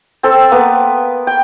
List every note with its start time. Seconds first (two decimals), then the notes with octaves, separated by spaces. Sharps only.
0.23 C4 A4
0.51 A#3 B3 B4
1.27 G5